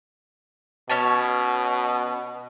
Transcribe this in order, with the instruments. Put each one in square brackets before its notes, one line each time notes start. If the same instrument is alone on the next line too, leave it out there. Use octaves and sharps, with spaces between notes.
[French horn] B2 [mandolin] C#4 C#5 A5